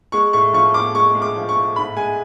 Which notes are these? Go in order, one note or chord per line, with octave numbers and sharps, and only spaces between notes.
G#3 C#6
A2 C#6
F3 C#6
A2 D6
G#3 C#6
G#3
D6
F3
C#6
A2
G#2 B5
G#3 G#5